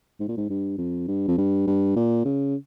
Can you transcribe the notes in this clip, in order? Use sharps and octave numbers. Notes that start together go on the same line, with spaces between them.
G#2
A#2
G#2
G2
F2
G2
F2
G2
G2
A#2
C#3